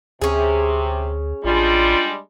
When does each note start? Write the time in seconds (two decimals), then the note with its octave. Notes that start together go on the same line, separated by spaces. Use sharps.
0.22 D2 C3 C#4 G#4
1.44 A1 G3 G#3 D4 F4